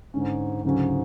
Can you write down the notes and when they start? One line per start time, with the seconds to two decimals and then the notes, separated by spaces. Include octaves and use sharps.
0.13 G#2 D3 G#3 C#4
0.64 D2 G#2 C#3 F#3 C#4